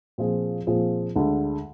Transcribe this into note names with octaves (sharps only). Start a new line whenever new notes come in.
A#2 F3 C4 F4 G#4
A#2 F3 C4 F4 G#4
D2 D3 G#3 D4